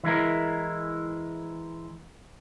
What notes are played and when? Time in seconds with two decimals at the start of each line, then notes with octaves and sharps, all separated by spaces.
0.04 E3 G#3 E4 A#4